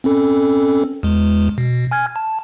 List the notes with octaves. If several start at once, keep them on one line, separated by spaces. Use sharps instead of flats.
C4 C#4 A4
E2 G#3
B2
G#5 F6 G#6
A5